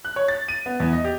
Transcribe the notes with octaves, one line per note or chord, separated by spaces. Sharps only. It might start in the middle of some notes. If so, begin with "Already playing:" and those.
F#6
C#5
A6
D#7
B3
E2
D#5
G4